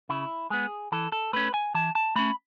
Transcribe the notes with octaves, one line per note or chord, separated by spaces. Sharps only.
C#3 E4
G#3 B3 G#4
E3 A4
A4
A3 C#4 B4
G#5
E3 A5
A5
A3 C#4 B5